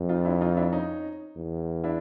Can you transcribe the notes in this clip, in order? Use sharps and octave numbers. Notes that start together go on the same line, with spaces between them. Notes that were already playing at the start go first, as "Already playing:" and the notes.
Already playing: F2
D#4 F4
D4 E4
D#4 F4
D4 E4
C#4 D#4
E2
D4 E4